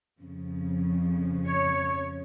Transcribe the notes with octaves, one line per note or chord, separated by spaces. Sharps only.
F2 C#3 F3
C#5